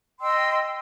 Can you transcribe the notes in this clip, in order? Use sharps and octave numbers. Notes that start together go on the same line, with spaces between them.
D#5 G5 C6 E6